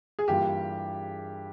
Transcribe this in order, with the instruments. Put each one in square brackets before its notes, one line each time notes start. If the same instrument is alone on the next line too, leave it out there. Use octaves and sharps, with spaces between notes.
[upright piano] G#4
[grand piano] G2 E3 A#3 F4 [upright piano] G4